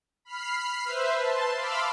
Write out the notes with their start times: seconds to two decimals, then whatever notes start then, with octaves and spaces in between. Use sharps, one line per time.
0.25 B5 F6 C7
0.85 B4 C5 E5
1.20 A5 C6
1.56 F5 B5 C6 D6 E6 F6